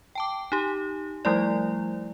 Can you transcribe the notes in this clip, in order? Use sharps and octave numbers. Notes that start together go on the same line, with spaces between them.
G5 A5 D6
D#4 G4
F3 G3 A3 E4 D5